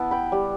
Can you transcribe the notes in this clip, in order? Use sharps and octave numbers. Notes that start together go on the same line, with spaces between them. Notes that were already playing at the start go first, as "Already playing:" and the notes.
Already playing: B3 E4 B4 A5
G5 B5
G3